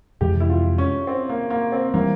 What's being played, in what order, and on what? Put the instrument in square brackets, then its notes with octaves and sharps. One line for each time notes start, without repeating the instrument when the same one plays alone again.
[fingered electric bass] F2 C3 E3 G#3 [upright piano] G4
[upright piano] E4
F4
C#4
C4
A#3
A#3
C4
[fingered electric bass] E3 G3 [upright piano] A#3